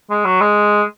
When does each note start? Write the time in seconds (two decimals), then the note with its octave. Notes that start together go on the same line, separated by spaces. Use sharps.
0.10 G#3
0.25 F#3
0.41 G#3